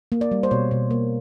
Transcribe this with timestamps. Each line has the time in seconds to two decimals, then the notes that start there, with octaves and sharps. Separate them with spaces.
0.12 A#3
0.21 D5
0.31 G3
0.43 C5
0.51 B2 C#5
0.71 B2
0.91 A#3